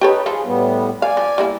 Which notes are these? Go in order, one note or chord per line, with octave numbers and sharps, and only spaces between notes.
D#4 G4 A4 B4 C#5
F3 F4 G#4 A4
A2 G3 B3
D5 F5 G#5
F3
G3 A#3 E4